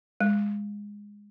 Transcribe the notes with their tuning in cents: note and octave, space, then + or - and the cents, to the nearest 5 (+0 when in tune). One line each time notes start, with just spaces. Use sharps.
G#3 -15